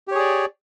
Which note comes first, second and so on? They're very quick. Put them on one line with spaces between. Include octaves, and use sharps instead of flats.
G4 C#5 G#4 D5